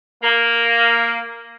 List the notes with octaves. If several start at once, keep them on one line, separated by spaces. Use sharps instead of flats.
A#3